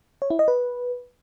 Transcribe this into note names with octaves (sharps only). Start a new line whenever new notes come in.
C#5
E4
D#5
B4